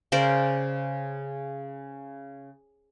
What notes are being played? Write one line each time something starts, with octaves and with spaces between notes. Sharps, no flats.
C#3 A#4 C5 D5